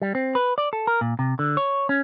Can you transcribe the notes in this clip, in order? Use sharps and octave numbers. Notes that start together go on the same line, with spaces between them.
G3
C4
B4
D5
A4
A#4
A#2
C3
D3
C#5
C#4